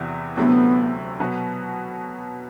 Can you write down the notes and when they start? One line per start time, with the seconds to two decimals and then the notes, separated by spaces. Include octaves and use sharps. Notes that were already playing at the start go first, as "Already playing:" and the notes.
Already playing: E2 C3 E3 B3 F#4
0.37 D2 C3 F#3 A3 B3 E4
1.20 B2 F#3 B3 F#4